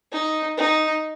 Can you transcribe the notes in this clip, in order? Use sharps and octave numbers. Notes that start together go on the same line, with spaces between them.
D#4
D#4